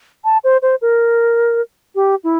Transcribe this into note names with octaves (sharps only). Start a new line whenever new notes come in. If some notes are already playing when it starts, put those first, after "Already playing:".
A5
C5
C5
A#4
G4
E4